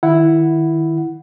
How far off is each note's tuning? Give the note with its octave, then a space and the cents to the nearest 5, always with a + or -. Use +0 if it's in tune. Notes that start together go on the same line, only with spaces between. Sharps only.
D#3 +0 E4 +0 F#5 +0